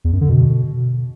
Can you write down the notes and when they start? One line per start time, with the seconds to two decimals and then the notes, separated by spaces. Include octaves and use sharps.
0.04 E2
0.13 F#2
0.21 D3
0.29 B2